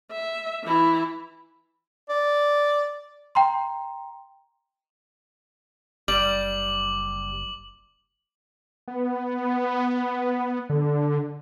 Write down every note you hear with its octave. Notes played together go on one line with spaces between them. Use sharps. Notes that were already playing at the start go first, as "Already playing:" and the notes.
E5
E3 E4
D5
G5 A#5 C6
F#1 G3 D6 F#7
B3
D3